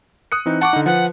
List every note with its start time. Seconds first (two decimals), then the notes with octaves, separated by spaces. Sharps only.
0.32 D#6 F#6 C#7
0.46 E3 C4 D#4
0.61 F#5 A5 C#6 D6
0.73 D3 D#4
0.86 F3 B4 F#5